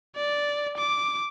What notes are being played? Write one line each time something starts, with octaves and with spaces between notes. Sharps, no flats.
D5
D6